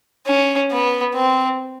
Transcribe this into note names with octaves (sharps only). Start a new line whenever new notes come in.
C#4
B3
C4